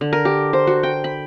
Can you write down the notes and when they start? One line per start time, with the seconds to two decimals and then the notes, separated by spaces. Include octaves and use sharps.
0.01 D3
0.13 A#4
0.25 G4
0.53 C5
0.67 F#4
0.83 G5
1.04 B5